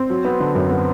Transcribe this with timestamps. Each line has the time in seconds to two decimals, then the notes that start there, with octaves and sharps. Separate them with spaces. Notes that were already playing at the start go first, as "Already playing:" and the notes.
Already playing: C4
0.10 F#3
0.25 B3
0.40 D3
0.55 F#2
0.70 B3